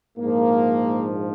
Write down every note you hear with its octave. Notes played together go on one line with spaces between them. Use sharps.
A#1 G#2 F3 A#3